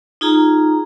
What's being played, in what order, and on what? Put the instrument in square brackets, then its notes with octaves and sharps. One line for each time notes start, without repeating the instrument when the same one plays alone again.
[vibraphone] D#4 F4 G#4 A#5